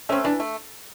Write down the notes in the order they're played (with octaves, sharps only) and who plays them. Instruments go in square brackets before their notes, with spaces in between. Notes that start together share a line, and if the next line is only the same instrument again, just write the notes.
[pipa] A3 [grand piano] C#4
[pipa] C4
[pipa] E3 [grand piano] D4
[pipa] A3